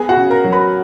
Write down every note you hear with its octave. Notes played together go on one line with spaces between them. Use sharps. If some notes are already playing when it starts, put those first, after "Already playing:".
Already playing: B3 G#4 G#5
F#4 F#5
C#3
A#4 A#5
F#3
B4 B5